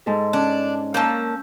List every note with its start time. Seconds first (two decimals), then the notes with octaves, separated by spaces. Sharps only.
0.06 G#2 A4
0.33 C#4 D4
0.94 A#3 C#4 A5 E6 G6